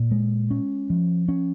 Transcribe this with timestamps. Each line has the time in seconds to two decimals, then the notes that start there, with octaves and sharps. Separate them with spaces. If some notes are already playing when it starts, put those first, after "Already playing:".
Already playing: A#2
0.11 G#3
0.51 C#4
0.90 F3
1.28 C#4